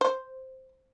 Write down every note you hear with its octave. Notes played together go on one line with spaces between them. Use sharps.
C5